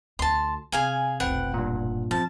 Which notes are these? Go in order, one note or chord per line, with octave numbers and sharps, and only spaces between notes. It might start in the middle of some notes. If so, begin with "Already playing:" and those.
D2 A5 C6
C3 G#4 F5 G#5
F1 B1 C4 B4 F#5 G5
G2 A#2
F3 C4 A5